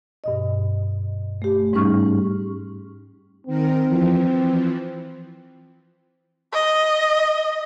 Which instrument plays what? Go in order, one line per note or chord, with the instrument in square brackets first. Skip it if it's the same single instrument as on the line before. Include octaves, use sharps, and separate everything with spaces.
[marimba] G2 B2 D#5
A3 G4
G#2 G3 C#4 D#4 C#6 F6
[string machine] D#3 A#4 [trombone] C4
[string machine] E3 F3
[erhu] D#5